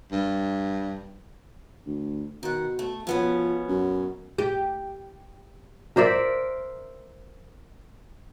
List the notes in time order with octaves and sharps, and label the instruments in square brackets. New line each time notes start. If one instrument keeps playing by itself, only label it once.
[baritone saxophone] G2
[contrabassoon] D2
[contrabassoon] B2 [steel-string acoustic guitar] D#3 F#5
[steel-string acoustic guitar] A3
[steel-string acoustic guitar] B2 B3 C#4 [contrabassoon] F3
[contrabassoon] F#2
[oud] G4
[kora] A#4 C5 D5 E5